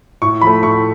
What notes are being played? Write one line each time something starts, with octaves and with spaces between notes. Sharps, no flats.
A2 C#6
F3 A3 B5
A2 C#6